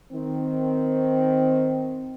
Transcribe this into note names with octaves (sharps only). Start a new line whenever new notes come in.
D#3 C4